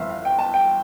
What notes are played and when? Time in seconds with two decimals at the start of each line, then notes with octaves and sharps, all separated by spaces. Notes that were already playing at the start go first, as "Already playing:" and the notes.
Already playing: G1 F2 E3 E5 F5
0.10 F5
0.25 G5
0.39 A5
0.54 G5